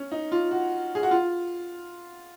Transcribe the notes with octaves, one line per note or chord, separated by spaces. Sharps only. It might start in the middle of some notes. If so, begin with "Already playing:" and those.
Already playing: C#4
D#4
F4
F#4
G#4
F#4
F4